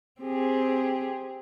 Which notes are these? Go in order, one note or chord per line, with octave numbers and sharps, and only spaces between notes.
C4 G4 G#4